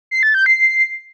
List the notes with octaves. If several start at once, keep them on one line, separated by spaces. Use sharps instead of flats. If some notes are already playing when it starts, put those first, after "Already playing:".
C7
A6
G6
C7